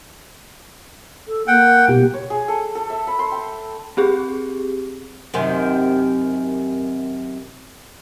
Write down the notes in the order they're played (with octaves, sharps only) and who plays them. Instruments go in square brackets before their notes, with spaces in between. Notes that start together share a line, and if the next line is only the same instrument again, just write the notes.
[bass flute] A4
[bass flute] A#3 [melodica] F#5 G5
[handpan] B2 G4
[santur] C#5
G#4
A4
A4
E5
B5
C6
G5
[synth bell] C4 G4 G#4
[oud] F#2 C3 D#3